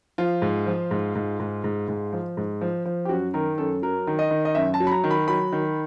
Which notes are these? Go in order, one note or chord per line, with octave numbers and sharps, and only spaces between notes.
F3 F4
G#2
F3
G#2
G#2
G#2
G#2
G#2
F3
G#2
F3
F3
G4
F#2 F#4
D#3 A#4
F#2 A4
F#3 A#4
D#3
D#5
D#3
D#5
F#2 E5
A5
F#3
B5
A#5
D#3
B5
F#3 B5
D#3